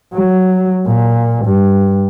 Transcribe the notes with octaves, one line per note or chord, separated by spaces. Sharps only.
F#3
A#2
G2